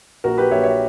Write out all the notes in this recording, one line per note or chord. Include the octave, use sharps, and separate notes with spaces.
A#1 F#4 A#4
G4 B4
A#1 C#5 E5
C#5 E5